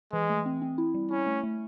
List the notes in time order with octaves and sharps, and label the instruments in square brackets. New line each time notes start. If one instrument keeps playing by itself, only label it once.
[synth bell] E3 [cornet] G#3
[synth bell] A3
C4
C4
E4
G3
[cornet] C#4 [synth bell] E4
[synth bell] A3
A3